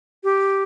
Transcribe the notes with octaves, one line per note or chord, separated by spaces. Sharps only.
G4